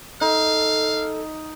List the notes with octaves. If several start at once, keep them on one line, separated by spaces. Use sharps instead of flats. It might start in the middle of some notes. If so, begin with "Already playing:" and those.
D#4 A4 F5